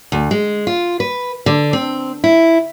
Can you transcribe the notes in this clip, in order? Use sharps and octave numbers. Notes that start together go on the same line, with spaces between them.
D2
G#3
F4
B4
D3
C4
E4